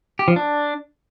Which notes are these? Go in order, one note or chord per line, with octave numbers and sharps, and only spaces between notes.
G4
F3
D4